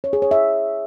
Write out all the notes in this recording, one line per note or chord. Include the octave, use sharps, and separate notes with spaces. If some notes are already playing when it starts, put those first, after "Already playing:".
C#5
G#4
C#5
E5